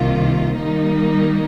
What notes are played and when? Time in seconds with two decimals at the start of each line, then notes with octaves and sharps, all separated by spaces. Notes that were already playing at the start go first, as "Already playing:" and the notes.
Already playing: C2 C3 D#3 A#3 F4
0.59 D#3 G3 A#3 D#4